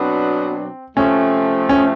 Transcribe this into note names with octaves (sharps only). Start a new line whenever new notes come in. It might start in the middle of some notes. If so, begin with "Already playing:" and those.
Already playing: B2 F#3 B3 C4 D4
C3 F3 A3 C#4
C#4